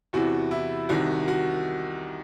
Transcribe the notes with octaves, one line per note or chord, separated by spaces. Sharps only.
E2 C3 E3 F#4
E4
C2 C3 D#3 F#4
F#4